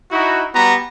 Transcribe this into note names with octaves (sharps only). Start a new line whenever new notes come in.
D#4 E4 F#4
G3 B3 F#4 A#5